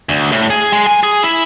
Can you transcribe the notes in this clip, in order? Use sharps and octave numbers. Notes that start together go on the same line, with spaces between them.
D2
A2
G#4
G#3
G#5
G#4
E4